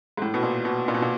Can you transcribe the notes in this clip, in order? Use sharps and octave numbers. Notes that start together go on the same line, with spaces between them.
G#2
A2
B2
A#2
B2
A#2
B2
A#2